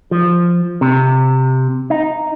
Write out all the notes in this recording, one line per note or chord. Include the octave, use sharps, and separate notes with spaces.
F3
C3
D#4